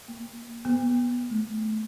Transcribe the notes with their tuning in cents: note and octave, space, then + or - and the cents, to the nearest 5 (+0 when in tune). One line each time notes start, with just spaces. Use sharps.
A#3 +0
B3 -20
A3 -25